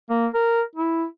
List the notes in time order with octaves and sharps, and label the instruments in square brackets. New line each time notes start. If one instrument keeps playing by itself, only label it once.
[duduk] A#3
A#4
E4